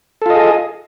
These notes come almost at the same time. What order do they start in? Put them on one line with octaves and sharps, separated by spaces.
A4 F4 D#5 G#4